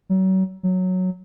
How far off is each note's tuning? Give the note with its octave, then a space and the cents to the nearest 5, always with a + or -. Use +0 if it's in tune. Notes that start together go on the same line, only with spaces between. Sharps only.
F#3 +35
F#3 -5